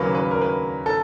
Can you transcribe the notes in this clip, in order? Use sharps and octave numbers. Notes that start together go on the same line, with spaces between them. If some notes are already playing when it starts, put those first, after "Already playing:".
Already playing: D#2 C#3 F#3 A#3 B4
B4
A#4
B4
A4